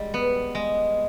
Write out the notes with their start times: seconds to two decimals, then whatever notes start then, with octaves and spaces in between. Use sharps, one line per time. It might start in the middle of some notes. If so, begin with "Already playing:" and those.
Already playing: G3 G#3
0.14 B3
0.55 G#3